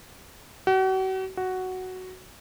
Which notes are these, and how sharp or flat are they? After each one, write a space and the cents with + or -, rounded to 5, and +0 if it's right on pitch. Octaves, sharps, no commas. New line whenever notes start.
F#4 +40
F#4 +5